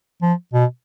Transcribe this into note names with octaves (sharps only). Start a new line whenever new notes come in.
F3
B2